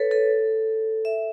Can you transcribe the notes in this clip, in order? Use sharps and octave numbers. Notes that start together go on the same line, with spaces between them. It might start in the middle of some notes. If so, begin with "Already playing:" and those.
Already playing: A4 B4 C#5
A4
E5